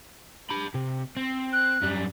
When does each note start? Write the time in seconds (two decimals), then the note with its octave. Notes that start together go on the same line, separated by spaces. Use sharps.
0.51 D4 B5
0.74 C3
1.17 C4
1.53 F#6
1.82 F#2 G3